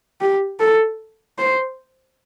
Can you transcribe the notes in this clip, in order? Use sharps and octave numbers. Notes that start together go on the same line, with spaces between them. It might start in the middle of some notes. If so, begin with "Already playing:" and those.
G4
A4
C5